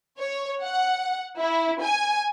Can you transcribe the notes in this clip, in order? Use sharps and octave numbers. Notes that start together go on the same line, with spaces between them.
C#5
F#5
E4
G#5